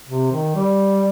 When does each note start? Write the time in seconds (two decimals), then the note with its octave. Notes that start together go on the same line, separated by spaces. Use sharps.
0.08 C3
0.32 D#3
0.55 G3